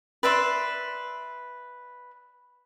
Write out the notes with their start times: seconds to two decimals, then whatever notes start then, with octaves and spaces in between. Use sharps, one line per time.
0.23 B4 D5 E5 C6